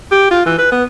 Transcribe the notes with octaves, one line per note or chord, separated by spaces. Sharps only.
G4
F4
E3
B4
B3